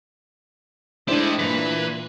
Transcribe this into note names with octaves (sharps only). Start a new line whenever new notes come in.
G#3 A3 D4 E4 G4 C5 D#5
A#2 E3 B4